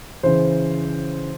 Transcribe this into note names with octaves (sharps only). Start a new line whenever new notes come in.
C#3 E3 C5